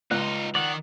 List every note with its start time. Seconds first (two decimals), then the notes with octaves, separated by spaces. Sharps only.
0.11 C#2 D#4 F4 F#6
0.55 D#3 D5 F#5